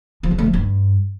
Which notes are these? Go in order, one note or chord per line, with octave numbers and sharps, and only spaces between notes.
F3
C#3
A3
F3
G2